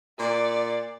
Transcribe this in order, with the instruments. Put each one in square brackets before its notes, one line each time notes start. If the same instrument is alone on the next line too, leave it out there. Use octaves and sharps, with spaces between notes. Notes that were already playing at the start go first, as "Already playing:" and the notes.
[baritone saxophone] A#2 [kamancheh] D5